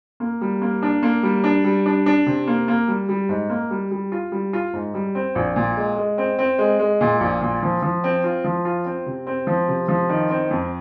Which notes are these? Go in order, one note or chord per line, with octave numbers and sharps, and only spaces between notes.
A#3
G3
A#3
D4
A#3
G3
D4
G3
D4
D4
C3
A#3
A#3
G3
G3
G#2
A#3
G3
G3
F4
G3
F4
G#2
G3
C4
A#1
A#2
G#3
G#3
C4
C4
G#3
G#3
A#2
A#1
A#2
F3
F3
C4
F4
F3
F4
C4
C3
C4
F3
C3
F3
D#3
C4
F2